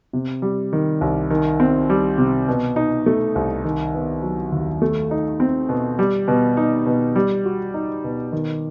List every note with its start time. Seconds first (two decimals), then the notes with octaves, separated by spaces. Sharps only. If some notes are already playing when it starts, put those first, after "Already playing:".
0.13 C3
0.42 G3
0.73 D#3
1.01 C2
1.30 D#3
1.60 C4
1.90 G3
2.18 C3
2.48 B2
2.76 D#4
3.06 A3
3.35 C2
3.65 D#3
3.94 B3
4.22 F#3
4.52 D#2
4.82 A3
5.11 D#4
5.40 C4
5.69 B2
5.99 G3
6.28 B2
6.57 D#4
6.86 B2
7.16 G3
7.45 F#4
7.74 D#4
8.04 B2
8.32 D#3